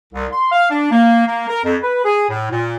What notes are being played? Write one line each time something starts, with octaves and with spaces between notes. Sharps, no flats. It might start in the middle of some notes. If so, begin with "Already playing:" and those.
C2
C6
F5
D4
A#3
A#3
A#4
F2
B4
G#4
A2
A#2